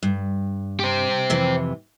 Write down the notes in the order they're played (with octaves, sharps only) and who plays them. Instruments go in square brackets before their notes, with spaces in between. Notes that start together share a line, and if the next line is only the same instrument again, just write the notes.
[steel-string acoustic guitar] G2
[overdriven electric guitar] G4 C5
[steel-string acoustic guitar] F2 C3 E3